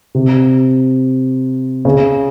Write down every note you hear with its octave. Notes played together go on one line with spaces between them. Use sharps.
C3
C#3